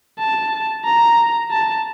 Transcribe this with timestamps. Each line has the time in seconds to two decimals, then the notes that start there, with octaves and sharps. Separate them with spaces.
0.19 A5
0.85 A#5
1.51 A5